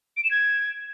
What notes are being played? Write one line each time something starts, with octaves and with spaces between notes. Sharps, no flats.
D7
E7
G#6